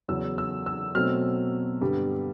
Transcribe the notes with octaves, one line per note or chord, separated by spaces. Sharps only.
E2 C#3 F#3 E6
E6
E6
B2 F#3 A3 C4 F6
G2 D3 G3 B3